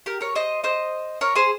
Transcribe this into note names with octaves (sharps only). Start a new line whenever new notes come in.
G4 A#4
A#4 C#5
C5 D#5
C5 D#5
A#4 C#5
G#4 C5